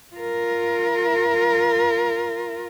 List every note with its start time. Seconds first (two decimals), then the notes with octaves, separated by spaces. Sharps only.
0.16 F4 A#4